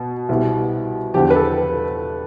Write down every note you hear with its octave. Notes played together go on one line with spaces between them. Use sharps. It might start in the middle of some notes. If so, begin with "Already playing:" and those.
Already playing: B2
C2 B2 G3
E2 D3 F3 G4
B4
A4